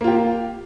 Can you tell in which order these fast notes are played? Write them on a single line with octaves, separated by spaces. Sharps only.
A#3 F4 G4